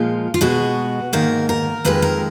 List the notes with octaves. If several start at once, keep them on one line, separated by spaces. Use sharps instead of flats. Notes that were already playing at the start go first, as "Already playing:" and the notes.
Already playing: A#2 F3 G#3 F4
F4
B2 G#3 F#4
G#2 D#3 A#3 A#4
A#4
F2 D#3 G#3 B4
A#4